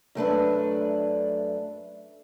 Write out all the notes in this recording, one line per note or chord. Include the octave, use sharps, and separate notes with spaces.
F#2 A3 D4 B4